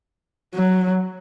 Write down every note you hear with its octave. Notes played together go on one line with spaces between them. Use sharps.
F#3